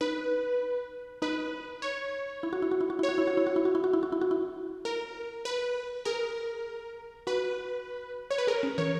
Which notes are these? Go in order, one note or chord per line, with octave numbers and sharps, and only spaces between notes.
D#4 B4
D#4 B4
C#5
E4
F#4
E4
F#4
E4
F#4
E4 C#5
F#4
E4
F#4
E4
F#4
E4
F#4
E4
F#4
E4
F#4
E4
F#4
E4
A#4
B4
G#4 A#4
F#4 B4
C#5
B4
G#4 A#4
C#4
E3 C#5